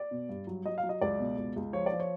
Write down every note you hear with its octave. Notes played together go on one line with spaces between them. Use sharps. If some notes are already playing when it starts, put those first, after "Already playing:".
Already playing: D5
B2
G2
F#3
F#3 D#5
F5
F#3
D#5
C#2 D5
B2
C#2
C#2
F3 C#5
D5
F3
C#5